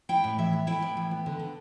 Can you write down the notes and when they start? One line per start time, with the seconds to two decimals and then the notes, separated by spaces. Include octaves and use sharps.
0.09 E4 G5
0.24 A2
0.38 E3 E5
0.53 B3
0.67 E4 G5
0.82 A2
0.97 E3
1.11 B3
1.26 D3
1.39 D3